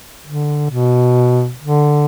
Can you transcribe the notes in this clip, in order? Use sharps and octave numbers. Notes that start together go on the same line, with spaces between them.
D3
B2
D3